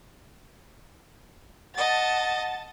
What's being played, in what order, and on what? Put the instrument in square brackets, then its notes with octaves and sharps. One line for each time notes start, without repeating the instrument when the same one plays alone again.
[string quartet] D#5 [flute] F#5 [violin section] A5 A6